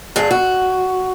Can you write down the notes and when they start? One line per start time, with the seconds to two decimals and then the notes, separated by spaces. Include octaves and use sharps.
0.16 G2 D3 G#4
0.31 F#4